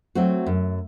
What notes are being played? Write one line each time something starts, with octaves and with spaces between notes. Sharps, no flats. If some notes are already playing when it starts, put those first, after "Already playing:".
F#3 A3 C4 F#4
F#2